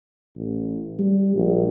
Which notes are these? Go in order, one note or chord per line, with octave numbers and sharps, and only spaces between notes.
A1
G3
A#1